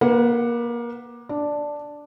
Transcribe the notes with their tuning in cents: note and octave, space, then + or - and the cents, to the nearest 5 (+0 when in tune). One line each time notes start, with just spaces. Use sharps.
A#3 +25 B4 +0 F#5 +0
D4 +0 D5 +0